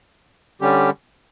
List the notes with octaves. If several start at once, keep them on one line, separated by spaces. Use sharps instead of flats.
D3 G3 C#4 G4